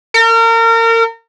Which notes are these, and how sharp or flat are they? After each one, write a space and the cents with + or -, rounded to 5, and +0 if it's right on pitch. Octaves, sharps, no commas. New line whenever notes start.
A#4 -35